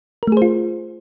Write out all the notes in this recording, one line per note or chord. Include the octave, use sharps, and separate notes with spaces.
A3 F4 G#4 A#4 C5